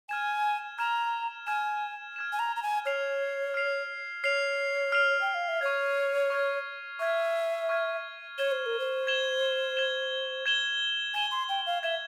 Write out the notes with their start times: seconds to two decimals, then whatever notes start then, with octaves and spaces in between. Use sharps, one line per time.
0.09 G#5 F6 G#6 E7
0.79 A#5 F6 G#6 E7
1.47 G#5 F6 G#6 E7
2.16 F6 G#6 E7
2.33 G#5
2.39 A#5
2.56 A#5
2.63 G#5
2.86 C#5 F6 C7 F7
3.54 F6 C7 F7
4.24 C#5 F6 C7 F7
4.92 F6 C7 F7
5.21 G5
5.34 F5
5.48 E5
5.61 C#5 C#6 F6 G#6
6.30 C#6 F6 G#6
6.99 E5 C#6 F6 G#6
7.69 C#6 F6 G#6
8.38 C#5 G#6 E7 G7
8.52 C5
8.66 A#4
8.79 C5
9.07 G#6 E7 G7
9.77 G#6 E7 G7
10.46 G#6 E7 G7
11.14 G#5 G#6 E7 G7
11.31 C6
11.49 G5
11.66 F5
11.83 E5 G#6 E7 G7